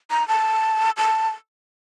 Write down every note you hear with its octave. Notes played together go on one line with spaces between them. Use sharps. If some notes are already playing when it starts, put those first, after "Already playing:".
A#5
A5
A5